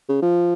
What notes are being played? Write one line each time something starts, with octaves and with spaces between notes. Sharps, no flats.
C#3
F3